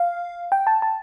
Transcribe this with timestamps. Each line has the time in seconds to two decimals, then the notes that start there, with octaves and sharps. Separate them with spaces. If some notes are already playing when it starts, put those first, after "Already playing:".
Already playing: F5
0.52 G5
0.67 A5
0.82 A5